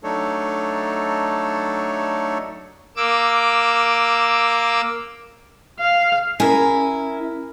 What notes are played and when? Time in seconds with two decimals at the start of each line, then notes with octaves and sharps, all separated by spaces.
0.04 F#3 A3 D4 D#4 A4 C#5
2.96 A#3 D6 E6
5.80 F5
6.40 C#4 E4 G#4 A#4